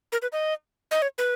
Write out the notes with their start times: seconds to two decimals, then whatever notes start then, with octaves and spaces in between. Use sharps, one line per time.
0.12 A#4
0.22 B4
0.32 D#5
0.91 D#5
1.02 C#5
1.18 B4